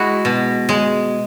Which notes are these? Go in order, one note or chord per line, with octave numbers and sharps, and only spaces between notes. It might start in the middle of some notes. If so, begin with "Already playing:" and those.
Already playing: G#3 E4 F#4
B2
G#3